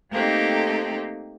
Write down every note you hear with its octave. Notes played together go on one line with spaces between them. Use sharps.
A3 A#3 C4 D#4 G4 A4